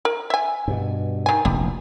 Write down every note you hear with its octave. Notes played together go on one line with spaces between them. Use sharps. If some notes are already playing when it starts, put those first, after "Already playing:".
A#4
E5 G#5
G2 B2
D#3 G#5
F1 A#1 E2 G3